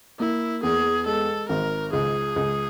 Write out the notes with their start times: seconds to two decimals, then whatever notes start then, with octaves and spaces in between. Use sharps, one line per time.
0.19 A#3 E4
0.63 E2 G#4
1.06 G#3 A4
1.49 G#1 A#4
1.92 C#2 G#4
2.36 C#2